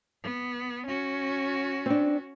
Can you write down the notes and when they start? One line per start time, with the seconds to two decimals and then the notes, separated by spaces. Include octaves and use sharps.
0.23 B3
0.87 C#4 F#4
1.86 C4 D4